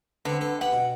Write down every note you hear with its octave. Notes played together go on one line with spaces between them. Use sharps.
D3 B3 C4
B3 A4
B3 G4 F#5
B2